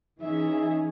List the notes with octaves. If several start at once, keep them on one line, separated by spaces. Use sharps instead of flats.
E3 C#4 D#4 G#4 E5